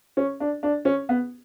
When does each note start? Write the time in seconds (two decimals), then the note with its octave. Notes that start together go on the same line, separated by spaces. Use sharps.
0.17 C#4
0.40 D4
0.63 D4
0.85 C#4
1.09 B3